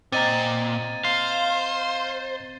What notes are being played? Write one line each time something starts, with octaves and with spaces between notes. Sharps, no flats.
A#2 C4 D#5 A#5 G#6 A6 D#7
C5 F5